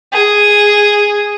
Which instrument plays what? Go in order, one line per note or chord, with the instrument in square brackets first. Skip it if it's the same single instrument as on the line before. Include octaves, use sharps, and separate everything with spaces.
[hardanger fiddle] G#4